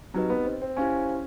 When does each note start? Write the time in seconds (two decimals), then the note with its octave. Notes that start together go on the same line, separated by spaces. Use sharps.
0.14 F#3 C4 D#4 G4 B4 D#5
0.30 B3
0.45 C4
0.62 C4
0.77 C#4 E4 G4 C5 F5 G#5